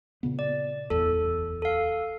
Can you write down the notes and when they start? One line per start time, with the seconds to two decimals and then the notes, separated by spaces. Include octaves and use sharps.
0.23 A#2 C#3 B3
0.39 D5
0.90 D1 G1 E2 A4
1.62 A4 F5